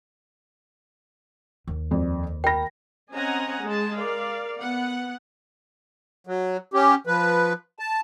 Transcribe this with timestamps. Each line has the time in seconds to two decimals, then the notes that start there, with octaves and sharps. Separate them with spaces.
1.67 D#2
1.91 F2 D5
2.44 A#4 G5 B5 A#6
3.12 C4 C#4 D#5 F#5 G#5 A#5
3.64 G#3 A5
3.95 A#4 D5 F5
4.59 B3 F#5
6.27 F#3
6.74 C#4 G4
7.07 F3 B4
7.79 A5